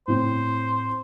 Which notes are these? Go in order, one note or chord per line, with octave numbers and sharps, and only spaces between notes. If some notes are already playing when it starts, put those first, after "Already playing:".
A2 C4 C5